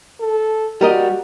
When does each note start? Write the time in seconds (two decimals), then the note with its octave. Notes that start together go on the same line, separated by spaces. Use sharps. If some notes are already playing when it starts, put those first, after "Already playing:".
0.20 A4
0.81 G3 F#4 A#4 D#5